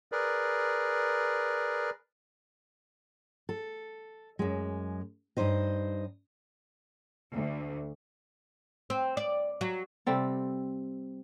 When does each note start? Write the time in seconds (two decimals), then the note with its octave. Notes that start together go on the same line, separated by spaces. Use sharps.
0.12 G#4 A#4 B4 D5
3.49 A4
4.39 F#2 G#3
5.37 G2 B2 D#4 C5 D#5
7.32 D2
8.90 C4
9.17 D5
9.61 F#3
10.06 C3 G3 C4 A4